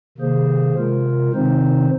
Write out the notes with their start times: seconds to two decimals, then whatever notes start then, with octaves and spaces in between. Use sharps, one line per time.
0.18 C3 D#3 A#3 G#4 C5
0.74 C3 G#3 F4 A#4
1.33 C3 D#3 C4 D#4 C5